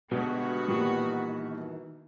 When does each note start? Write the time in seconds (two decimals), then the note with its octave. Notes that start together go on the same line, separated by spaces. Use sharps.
0.11 B2 D3 G3 G#3 B3 F#4
0.68 A#2 D#3 E3 G3